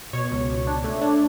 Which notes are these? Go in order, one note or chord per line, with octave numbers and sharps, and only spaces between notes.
B2 C#5
C#2
C#2
D4
A3
D4